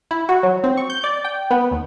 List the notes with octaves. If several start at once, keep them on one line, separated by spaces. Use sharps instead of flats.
E4
F#4
F#3
C4
C#6
G6
D5
G5
B3
D#2